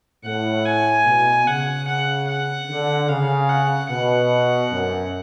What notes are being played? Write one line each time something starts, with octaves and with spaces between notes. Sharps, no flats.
A2 F#5
G#5
B2
C#3 F#5
F#5
F#5
D3
C#3 F5
F#5
B2 F#5
F#2